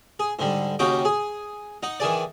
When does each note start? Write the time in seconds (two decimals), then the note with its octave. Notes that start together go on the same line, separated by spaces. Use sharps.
0.19 G#4
0.39 G#2 D3 G3
0.79 D#2 C#3 D#4 F#4 G5 D6
1.05 G#4
1.83 D#4 F#5
2.00 D#3 E3 G#4 D5